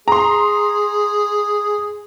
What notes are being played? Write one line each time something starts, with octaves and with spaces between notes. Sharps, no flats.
G#4 A#5 C6